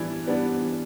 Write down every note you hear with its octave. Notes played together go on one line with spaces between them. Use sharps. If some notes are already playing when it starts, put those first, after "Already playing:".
Already playing: E3 G3 B3 D4
G3 B3 D4
E3